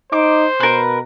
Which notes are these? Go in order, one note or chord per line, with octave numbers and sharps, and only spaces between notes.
D#4 C5 D6
B2 A#4 B4